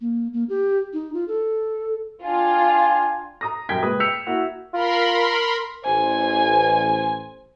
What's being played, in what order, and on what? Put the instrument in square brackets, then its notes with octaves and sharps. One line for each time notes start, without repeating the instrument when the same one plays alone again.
[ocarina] A#3
A#3
G4
D#4
F4
A4
[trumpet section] D4 G5 G#5 [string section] F4
[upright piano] A#5 D#6 A#6
D#1 F#2 G5 G#6 B6
C#2 A#2 B4 D#6
G5 E6 G6 B6 C#7 F7
A#3 E4 F#4
[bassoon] F4 [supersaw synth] A#4 B5 C6
[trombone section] A1 C5 [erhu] G#5